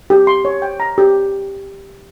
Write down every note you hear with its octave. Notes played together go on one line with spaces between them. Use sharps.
G4
C6
C#5
G5
A#5
G4